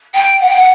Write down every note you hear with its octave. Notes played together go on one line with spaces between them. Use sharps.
G5
F#5
G5
F#5